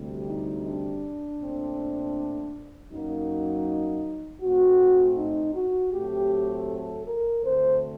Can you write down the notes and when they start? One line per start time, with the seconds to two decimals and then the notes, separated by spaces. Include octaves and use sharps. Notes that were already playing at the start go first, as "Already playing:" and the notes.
Already playing: D2 C3 G3
0.26 D#4
0.64 D4
1.40 A#2 A3 C4
2.90 F#2 F#3 A#3 D#4
4.41 A2 A3 C4 F#4
5.16 D#4
5.54 F#4
5.92 A2 F#3 A3 C4 G4
6.68 A4
7.05 A#4
7.43 D2 D3 A3 C4 C5